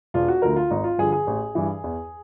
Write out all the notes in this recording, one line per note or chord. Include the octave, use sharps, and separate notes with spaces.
E1 F4
F#4
D2 D3 F3 A#4
F4
G#1 D#4
F4
G2 D3 F3 G#4
G#4
A1
G2 E3
E2